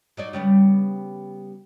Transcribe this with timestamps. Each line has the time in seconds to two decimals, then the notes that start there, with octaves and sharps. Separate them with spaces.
0.17 F#3 D#4 D5
0.33 C#3 G3 B3